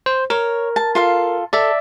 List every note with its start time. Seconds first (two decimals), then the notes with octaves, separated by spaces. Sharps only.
0.06 C5
0.30 A#4 C#5
0.76 A5
0.95 F4 A4 F5
1.53 A4 D5 E5